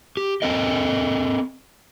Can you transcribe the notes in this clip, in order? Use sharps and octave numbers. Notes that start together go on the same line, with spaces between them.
G4
C4 A4 A#4 D#5